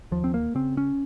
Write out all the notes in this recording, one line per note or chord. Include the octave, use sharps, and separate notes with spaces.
D#2 F3
C4
A#3
C#3 C4
C#4